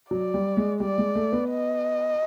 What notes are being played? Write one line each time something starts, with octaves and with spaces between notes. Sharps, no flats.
F#3 D5
G3
G#3
G3 D5
G#3
A3
B3
D#5